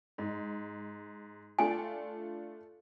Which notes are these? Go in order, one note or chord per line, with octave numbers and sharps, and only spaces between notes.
G#2
A3 D4 F4 G#5